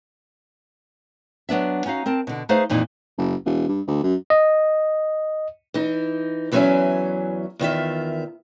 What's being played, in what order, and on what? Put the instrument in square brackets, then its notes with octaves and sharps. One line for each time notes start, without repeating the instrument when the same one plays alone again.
[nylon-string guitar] F#3 B3 D4 E5
C#4 D#4 F#4 F5
C4 A#4 A5
B2 D3
A3 D#4 G#4 B4 C5 F5
F2 A#2 E3 D#4
[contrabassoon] F#1
E1
G2
D2
F#2
[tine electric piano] D#5
[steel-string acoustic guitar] E3 D#4
E2 E3 F#3 C#4 E5 G#5
E2 D#3 F4 E5